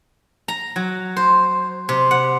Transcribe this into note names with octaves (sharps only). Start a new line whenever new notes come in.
A#5
F#3
C5
C3
F#5